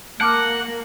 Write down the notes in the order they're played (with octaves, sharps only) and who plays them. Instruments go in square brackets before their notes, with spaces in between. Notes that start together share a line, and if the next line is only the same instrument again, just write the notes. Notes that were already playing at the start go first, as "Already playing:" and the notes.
[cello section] A#3 [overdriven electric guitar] F#5 [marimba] A5 D6 F6